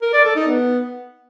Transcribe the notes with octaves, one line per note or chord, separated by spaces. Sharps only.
A#4
D5
A4
D#4
B3